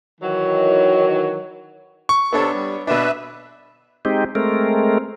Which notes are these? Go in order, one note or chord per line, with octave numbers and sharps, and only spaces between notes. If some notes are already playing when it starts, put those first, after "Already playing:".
D#3 E3 F#3
C#6
C3 B3 D4 A4 C#5
G3
B2 D4 B4 E5
G#3 C4 D#4 G4
G#3 A3 C4 A#4